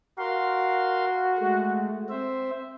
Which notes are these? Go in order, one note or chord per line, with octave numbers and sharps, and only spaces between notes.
F#4 A#4 F5 C6
G#3 A3
C4 C5 E5